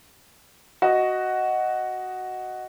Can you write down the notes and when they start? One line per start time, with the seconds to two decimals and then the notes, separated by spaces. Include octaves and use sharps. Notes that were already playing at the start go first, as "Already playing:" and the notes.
0.82 F#4 D#5